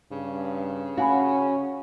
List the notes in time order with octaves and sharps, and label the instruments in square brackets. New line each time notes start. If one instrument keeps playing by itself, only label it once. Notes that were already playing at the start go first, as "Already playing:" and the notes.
[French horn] G2 [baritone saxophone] C#3
[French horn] C#4 [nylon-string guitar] F#4 [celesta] F5 G#5 B5